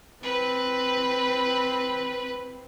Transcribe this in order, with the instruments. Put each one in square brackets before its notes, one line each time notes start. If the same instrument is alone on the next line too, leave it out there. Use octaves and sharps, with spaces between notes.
[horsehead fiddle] C4 [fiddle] B4